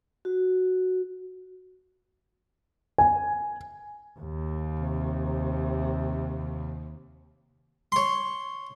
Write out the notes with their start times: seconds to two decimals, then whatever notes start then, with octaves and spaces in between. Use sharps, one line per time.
0.25 F#4
2.98 G#5
4.19 D#2
4.79 C3
7.92 C#5 C6